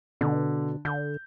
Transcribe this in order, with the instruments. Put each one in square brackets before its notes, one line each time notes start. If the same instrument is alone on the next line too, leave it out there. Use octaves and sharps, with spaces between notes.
[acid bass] B2 [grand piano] D3
[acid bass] D3 [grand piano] G6